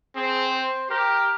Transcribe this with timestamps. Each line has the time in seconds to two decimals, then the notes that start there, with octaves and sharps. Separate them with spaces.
0.16 C4 G#4
0.48 C5
0.90 G4 A#4